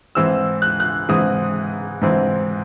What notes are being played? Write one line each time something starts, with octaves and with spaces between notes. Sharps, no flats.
G#2 E3 C4 E6
F#6
F#6
G#2 E3 C4 D#6
G#2 E3 C4